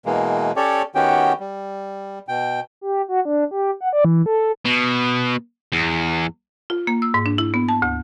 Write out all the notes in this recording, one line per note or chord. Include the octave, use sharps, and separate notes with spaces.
B2 E3 G#3 A#3
C#4 G4 A4 C#5 D5
D#3 B3 C#4 F#4 G4 G5
G3
B2 G5
G4
F#4
D4
G4
F#5
D5
E3
A4
B2
E2
F4
A#3
E6
G#2
D4
E4
B3
A5
D2